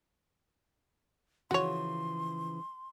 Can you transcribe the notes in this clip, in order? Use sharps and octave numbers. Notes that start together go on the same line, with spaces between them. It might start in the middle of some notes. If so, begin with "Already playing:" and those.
C#3 E3 F3 F#4 C#5 C6